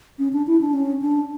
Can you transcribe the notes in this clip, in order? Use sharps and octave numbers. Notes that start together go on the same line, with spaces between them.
C#4
D4
E4
D4
C#4
D4